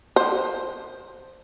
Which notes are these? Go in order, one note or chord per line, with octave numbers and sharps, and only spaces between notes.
C5